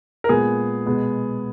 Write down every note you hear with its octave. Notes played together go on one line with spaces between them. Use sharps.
A#4
A#2 G#3 B3 G#4
B2 G#3 B3